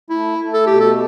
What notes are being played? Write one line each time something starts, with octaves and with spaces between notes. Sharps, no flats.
A3 E4
A3
A4
B2 G4
A4